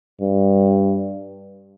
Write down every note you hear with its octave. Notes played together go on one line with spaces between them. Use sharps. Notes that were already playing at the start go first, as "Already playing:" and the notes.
G2